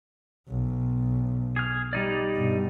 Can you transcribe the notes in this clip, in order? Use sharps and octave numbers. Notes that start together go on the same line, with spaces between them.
B1
G#4 F6
G3 D#4 D5
G2 B2